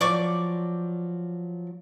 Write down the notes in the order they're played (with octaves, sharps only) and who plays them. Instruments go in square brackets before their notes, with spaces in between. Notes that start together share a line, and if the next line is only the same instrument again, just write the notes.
[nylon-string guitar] F3 F#3 [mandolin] D5 C#6 D6